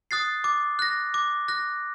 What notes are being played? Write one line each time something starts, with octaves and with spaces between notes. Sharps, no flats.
D#6 F#6 A6 C7
D6
F#6 A#6
D6
F#6 A#6